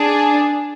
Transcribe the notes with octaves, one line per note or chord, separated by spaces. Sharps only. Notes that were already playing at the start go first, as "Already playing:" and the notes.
Already playing: D4 G#4